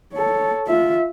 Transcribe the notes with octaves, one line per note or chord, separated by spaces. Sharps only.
A4 C#5
F4 E5